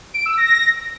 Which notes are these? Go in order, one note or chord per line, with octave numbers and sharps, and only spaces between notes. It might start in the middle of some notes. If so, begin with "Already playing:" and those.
D7
E6
A#6